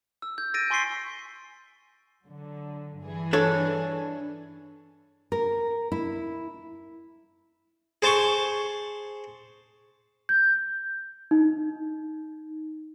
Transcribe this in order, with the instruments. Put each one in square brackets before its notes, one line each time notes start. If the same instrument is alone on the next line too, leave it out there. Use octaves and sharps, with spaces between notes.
[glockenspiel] E6
G6
E6 A6 A#6 D7 D#7
G#5 C6 C#6 B6 C7 G7
[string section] D3 F#3
G2 E3 G#4
[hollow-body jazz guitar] D4 A4 C#5
[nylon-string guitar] A#4
E4
[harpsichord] G#4 C5 A5 C6 C#6
[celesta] G6
D#4